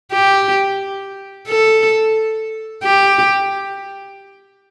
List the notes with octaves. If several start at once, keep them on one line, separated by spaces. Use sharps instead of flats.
G4
A4
G4